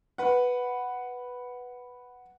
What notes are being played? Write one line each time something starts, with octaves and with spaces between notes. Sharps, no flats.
B4 F#5